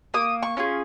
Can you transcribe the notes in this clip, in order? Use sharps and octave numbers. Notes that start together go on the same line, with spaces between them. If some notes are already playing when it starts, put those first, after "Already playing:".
A#3 D#6
C#6
C#4 F4 G#4